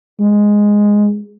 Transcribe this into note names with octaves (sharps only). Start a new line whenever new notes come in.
G#3